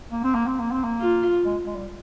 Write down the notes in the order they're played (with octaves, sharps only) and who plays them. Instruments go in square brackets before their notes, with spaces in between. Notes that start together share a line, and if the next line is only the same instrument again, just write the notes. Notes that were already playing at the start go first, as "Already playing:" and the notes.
[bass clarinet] A#3
C4
A#3
C4
A#3
C4
A#3
[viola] F4
[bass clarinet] G#3
G#3
G3